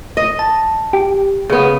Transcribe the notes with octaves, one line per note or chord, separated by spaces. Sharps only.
D#5
A5
G4
C#3 B3